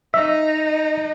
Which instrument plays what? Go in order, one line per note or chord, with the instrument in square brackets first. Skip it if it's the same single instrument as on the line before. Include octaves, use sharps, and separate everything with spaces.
[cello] D#4 [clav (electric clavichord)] E5